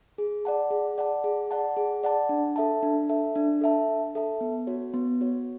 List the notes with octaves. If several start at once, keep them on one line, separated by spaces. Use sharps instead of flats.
G#4
D5 F#5 A5
G#4
D5 F#5 A5
G#4
D5 F#5 A5
G#4
D5 F#5 A5
D4
A4 E5 A5
D4
A4 E5 A5
D4
A4 E5 A5
D4
A4 E5 A5
B3
F#4 C#5
B3
F#4 C#5